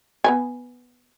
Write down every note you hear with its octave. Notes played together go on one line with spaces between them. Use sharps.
B3 B4 G#5